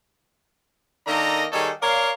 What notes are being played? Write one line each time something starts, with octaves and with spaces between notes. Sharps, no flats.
D#3 A#3 D4 A4 D#5 A#5
D#3 G3 D#4 G#4 A4 C#5
A#4 C#5 D5 F5